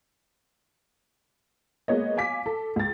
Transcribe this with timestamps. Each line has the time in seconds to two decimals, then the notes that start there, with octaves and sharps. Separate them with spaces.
1.88 G#3 A#3 B3 C#5 D#5
2.17 F5 G#5 D6 B6
2.46 A4
2.76 C#2 A6